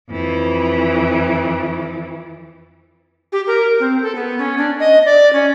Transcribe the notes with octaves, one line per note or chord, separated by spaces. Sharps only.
F2 E3
G4
A#4
C4
A4
B3
C#4
D4
D#5
D5
C#4